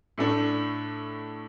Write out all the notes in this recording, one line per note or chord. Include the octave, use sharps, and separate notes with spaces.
A2 A3 D4